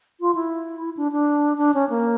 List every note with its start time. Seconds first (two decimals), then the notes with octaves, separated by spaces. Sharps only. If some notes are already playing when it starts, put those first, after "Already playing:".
0.21 F4
0.35 E4
0.97 D4
1.12 D4
1.58 D4
1.74 C#4
1.90 A#3